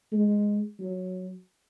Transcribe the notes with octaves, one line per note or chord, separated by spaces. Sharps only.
G#3
F#3